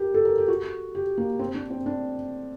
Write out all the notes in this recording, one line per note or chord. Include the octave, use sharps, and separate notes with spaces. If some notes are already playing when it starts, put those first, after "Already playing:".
Already playing: G4 A#4
A4
A#4
G4
F#4
G4
A#3
C4
D4
C4
D4